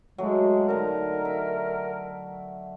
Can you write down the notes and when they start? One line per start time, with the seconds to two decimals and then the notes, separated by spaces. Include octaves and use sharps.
0.18 F#3 G#3 A3
0.68 D3 D#4 A#4
1.25 E5